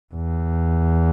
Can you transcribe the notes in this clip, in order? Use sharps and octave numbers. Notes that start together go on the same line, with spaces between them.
E2